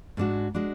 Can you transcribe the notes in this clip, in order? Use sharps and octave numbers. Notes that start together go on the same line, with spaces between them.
G#2 G#3 D4 F#4
G#3 D4 F#4